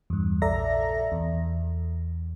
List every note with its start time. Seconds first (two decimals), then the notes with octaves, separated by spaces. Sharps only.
0.10 E2 G2
0.42 A#1 A4 D5 E5 A#5 A#6
1.12 E2